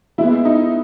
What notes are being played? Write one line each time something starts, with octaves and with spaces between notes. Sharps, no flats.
E3 G#3 B3 E4
D#4